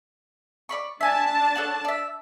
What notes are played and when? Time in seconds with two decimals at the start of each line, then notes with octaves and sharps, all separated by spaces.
0.69 D5 B5 C#6
1.01 D4 E5 G#5 A5
1.55 A4 C#5 F#5
1.85 D5 E5